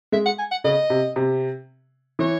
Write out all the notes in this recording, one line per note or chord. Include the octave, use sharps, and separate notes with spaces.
G#3 E5
F#5
G#5
F#5
C#3 D#5
C3
C3
E3 C#5